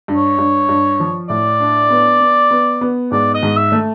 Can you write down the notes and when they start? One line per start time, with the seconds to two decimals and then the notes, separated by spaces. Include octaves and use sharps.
0.08 G2
0.16 C#5
0.39 G2
0.69 G2
1.00 F3
1.29 A2 D5
1.60 D4
1.90 B3
2.21 B3
2.51 B3
2.81 B3
3.11 G#2 D5
3.35 D#5
3.43 G#2
3.57 E5
3.72 A3